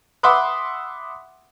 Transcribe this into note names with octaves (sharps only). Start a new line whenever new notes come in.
E5 F#5 B5 C6 D6 D#6